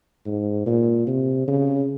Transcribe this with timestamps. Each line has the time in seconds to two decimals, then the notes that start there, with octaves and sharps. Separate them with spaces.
0.26 G#2
0.66 A#2
1.07 C3
1.48 C#3